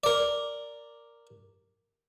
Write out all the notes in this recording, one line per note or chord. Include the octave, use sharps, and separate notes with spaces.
A#4 D5